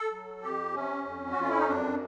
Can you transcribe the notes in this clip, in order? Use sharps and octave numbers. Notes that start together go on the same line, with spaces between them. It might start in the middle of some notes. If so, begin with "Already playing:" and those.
Already playing: A4
F#3
F2 G4
C3 C#4
F2
F#4
F2 F4
E4
D#4
F#2 D4